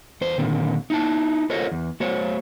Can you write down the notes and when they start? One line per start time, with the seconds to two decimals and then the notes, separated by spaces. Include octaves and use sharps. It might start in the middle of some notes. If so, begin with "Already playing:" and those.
0.21 E2 C5
0.38 A#2 D3 D#3 C4
0.90 D#4 E4 A5
1.50 F4 A4 A#4 C5 C#5 D#5
1.72 E2
2.00 A3 F#4 C5 C#5